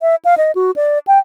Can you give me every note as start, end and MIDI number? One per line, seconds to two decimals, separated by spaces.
0.01 0.15 76
0.25 0.35 77
0.37 0.51 75
0.55 0.71 66
0.76 0.98 74
1.07 1.19 79